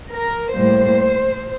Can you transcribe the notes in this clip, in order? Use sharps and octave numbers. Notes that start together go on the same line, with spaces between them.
A#4
A2 G3 A#3 C5